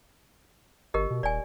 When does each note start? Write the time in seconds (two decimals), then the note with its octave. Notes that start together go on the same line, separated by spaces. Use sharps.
0.94 G1 G4 A#4 D#5
1.11 B2
1.23 D#1 D5 G#5